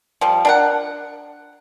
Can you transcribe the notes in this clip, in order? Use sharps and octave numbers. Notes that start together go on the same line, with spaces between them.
F3 G3
D4 A#4 F#5